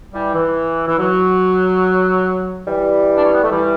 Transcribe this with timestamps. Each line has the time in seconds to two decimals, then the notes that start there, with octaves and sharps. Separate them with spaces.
0.13 E3 G3
0.34 E3
0.87 E3
0.98 F#3
2.66 E3 G3
3.17 D4
3.24 C#4
3.33 B3
3.42 A3
3.50 E3 G3